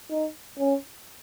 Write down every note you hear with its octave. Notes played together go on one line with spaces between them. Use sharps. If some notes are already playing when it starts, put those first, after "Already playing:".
D#4
C#4